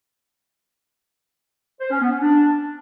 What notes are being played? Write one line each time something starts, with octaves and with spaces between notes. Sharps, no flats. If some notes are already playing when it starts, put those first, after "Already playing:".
C5
C#4
B3
C#4
D4